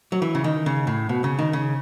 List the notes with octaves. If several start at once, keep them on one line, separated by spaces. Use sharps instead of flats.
F#3
E3
C#3
D#3
C#3
A2
B2
C#3
D#3
C#3